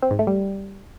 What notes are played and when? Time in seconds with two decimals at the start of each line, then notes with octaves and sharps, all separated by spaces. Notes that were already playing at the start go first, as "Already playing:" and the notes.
0.02 C4
0.11 G#2
0.19 A3
0.27 G3